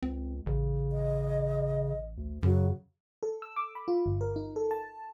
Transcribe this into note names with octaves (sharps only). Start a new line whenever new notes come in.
C#2 C4
A1 C#3
D#5
D2
F#2 C#3 F#3
A4
E6
D6
B5
F4
G1
A#4
D#4
A4
A5